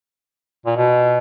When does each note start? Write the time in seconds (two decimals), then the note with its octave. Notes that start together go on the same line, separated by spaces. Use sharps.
0.66 A#2
0.77 B2